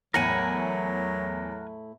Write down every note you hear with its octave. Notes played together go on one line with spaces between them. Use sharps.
E2 A2 F#3 A3 E4 A#4 F#5 G#5